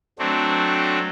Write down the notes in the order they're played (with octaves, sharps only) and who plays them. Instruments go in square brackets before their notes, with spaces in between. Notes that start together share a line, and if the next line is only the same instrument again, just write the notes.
[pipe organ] F#3 A3 C4 D4